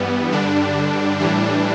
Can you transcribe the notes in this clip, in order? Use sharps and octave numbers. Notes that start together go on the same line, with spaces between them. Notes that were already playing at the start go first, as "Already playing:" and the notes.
Already playing: G2 E3 G3 B3
G2 D3 G3 D4
A2 E3 G3 D4